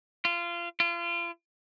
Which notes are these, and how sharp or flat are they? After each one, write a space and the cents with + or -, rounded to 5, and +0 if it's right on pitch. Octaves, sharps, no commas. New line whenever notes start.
F4 -25
F4 -35